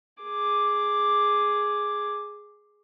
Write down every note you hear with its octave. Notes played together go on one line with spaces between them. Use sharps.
G#4 D6